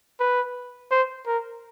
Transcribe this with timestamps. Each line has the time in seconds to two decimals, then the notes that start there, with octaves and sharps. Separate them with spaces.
0.20 B4
0.91 C5
1.27 A#4